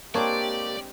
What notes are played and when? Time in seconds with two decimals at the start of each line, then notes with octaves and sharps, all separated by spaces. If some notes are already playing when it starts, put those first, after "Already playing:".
0.15 G#3 A#3 C4 D4 G4 C#5 D5